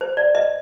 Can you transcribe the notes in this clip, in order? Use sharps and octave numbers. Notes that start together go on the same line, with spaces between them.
C5
D5
D#5